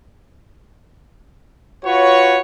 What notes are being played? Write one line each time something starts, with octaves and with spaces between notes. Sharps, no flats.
F4 F#4 B4 C#5